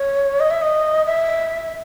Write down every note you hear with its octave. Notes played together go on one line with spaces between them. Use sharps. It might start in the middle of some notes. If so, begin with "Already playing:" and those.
Already playing: C#5
D#5
E5
D#5
E5